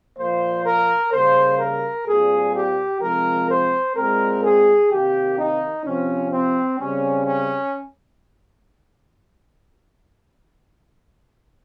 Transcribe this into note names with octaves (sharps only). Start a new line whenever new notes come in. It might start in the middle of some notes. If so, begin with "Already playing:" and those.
A#2 F3 A#3 C5
A#4
C#3 G3 A#3 C5
A#4
A#2 G3 C4 G#4
G4
C3 F3 G#3 C4 A#4
C5
A#2 G#3 C4 A#4
G#4
C3 D#3 A#3 G4
D#4
C3 F3 C4 C#4
C4
C#3 G3 C4 C#4
C#4